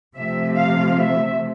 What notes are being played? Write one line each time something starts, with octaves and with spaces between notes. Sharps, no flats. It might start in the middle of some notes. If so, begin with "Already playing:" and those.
C3 F3 A3 E5
F5
E5